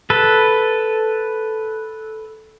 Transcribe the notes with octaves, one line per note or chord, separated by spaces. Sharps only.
A4 B4